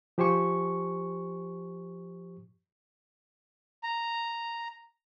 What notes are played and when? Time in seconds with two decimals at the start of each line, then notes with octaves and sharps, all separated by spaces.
0.18 F3 G4 C5 G#5 C#6
3.83 A#5